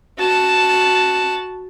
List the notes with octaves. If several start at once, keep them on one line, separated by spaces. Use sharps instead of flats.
F#4 A5